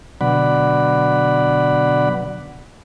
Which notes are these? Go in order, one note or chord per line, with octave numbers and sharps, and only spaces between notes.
B2 D3 F#3 D5 F#5 B5